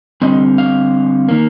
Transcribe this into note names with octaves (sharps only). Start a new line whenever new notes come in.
D3 G3 C4 D#5
F5
D#3 A#3